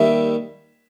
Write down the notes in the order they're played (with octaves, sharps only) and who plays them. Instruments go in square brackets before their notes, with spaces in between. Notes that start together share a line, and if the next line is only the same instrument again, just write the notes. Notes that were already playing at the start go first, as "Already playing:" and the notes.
Already playing: [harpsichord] D#2 D#3 G3 [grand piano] E5